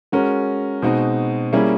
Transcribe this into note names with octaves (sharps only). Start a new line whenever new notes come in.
G#3 C#4 F#4 A#4
B2 G#3 C4 D#4 F#4
G3 A#3 C#4 E4 G#4